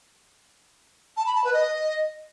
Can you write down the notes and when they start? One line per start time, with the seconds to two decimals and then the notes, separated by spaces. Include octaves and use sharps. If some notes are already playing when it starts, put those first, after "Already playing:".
1.17 A5
1.26 B5
1.35 A5
1.44 B4
1.53 D#5